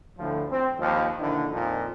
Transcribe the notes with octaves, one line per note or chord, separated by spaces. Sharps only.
D2 A2 D3 F3
C4
D#2 F3
A#1 D3 D#3 D4 E4
F2 A#2 D#3 F3